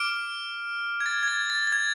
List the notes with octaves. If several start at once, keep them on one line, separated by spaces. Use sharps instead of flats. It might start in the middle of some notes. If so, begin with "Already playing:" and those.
Already playing: D6 F6 D7
G#6
A6
G#6
A6
A6
A6
G#6